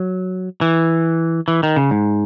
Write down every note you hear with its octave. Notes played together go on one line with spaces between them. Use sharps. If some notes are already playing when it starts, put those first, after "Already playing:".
Already playing: F#3
E3
E3
D#3
C#3
G#2